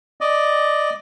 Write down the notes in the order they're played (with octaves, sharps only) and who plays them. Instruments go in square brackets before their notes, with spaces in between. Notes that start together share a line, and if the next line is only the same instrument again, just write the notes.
[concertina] D5 D#5